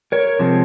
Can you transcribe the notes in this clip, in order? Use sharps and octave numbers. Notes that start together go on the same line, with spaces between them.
A#4 C#5
C3 F3 G#3 C4